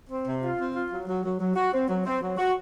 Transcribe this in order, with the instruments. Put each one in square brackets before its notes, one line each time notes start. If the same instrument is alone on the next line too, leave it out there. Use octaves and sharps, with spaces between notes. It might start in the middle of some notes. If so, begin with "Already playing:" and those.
[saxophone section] C4
C3
F4
C4
F4
F#3
F#3
F#3
F#3
F#4
C4
F#3
C4
F#3
F#4